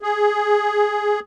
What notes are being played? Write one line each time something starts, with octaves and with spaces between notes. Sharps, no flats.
G#4